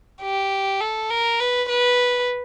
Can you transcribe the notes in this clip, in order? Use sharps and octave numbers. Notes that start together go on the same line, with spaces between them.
G4
A4
A#4
B4
B4